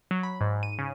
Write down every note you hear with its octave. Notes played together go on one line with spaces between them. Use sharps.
F#3
B5
G#2
D#7
C#3